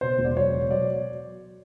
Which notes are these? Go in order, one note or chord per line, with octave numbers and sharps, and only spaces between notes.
B2 C5
E1
D5
F#3 C#5
B2
F#3 D5